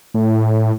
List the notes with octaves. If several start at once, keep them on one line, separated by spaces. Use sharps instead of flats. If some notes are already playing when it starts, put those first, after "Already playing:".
A2